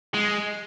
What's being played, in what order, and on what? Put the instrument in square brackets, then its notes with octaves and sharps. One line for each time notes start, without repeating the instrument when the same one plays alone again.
[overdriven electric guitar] G#3